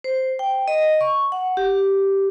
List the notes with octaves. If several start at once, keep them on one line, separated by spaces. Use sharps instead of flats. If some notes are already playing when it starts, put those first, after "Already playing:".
C5
G5
D#5
C#6
F#5
G4